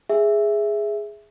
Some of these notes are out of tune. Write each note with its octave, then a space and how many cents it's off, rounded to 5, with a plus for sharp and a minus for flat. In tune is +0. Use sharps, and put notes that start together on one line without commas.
G#4 +0 E5 +0